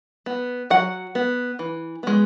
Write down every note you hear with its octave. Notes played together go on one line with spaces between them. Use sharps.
B3
F#3 F#5
B3
E3
G#3 B3